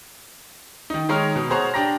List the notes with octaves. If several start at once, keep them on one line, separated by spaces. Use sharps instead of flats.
D#3 D#4
D#3 G#3 C#5 A#5 F6
B2
G#4 C5 C#5 F#5 A#5
D4 G4 A#5 A#6